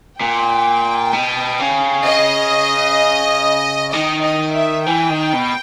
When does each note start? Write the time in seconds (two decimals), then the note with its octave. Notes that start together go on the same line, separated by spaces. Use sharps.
0.20 A#2 G5
1.13 B2
1.59 C#3
2.06 D#5
3.93 D#3 D#5
4.24 D#5
4.55 E5
4.86 E3 G5
5.10 D#3
5.33 B2